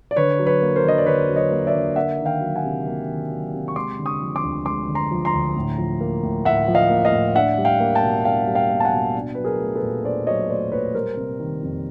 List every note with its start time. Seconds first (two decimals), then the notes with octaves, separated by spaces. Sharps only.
0.11 D5
0.16 D3 B4 C#5
0.39 F#3
0.46 B4 C#5
0.61 A#3
0.76 A#4 C5
0.84 D3 D#5
0.98 D5
1.06 D3 B4 C#5
1.29 F#3
1.36 C#5 D#5
1.51 A#3
1.67 D5 E5
1.74 D3
1.96 A#3 E5 F#5
2.19 D#3
2.26 F5 G5
2.41 F#3
2.56 F#5 G#5
2.64 C3
2.87 A#3
3.08 D#3
3.31 F#3
3.54 C3
3.68 C#6
3.76 G#3 C6 D6
3.99 D3
4.06 C#6 D#6
4.21 F3
4.36 C6 D6
4.43 D2
4.66 G#3 C6 D6
4.89 D3
4.95 A#5 C6
5.11 F3
5.25 A#5 C6
5.34 D2
5.56 A2
5.78 F3
6.01 A#3
6.23 A2
6.45 A2 E5 F#5
6.68 F3
6.75 D#5 F5
6.90 A#3
7.05 D#5 F5
7.12 A2
7.35 D4 E5 F#5
7.58 G3
7.65 F5 G5
7.80 A#3
7.95 G5 A5
8.03 B2
8.25 D4 F5 G5
8.47 G3
8.55 F5 G5
8.70 A#3
8.80 A5
8.85 F#5 G#5
8.93 B2
9.15 D4
9.35 F#3 B4
9.45 G#4 A#4
9.60 A3
9.75 A4 B4
9.82 A#2
10.04 D4 C5 D5
10.27 F#3 C#5 D#5
10.49 A3 C5 D5
10.72 A#2 B4 C#5
10.94 G3 A#4 C5
11.17 C3
11.40 D#3
11.63 F2